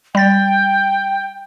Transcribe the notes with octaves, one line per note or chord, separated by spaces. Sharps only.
G3 G5 A6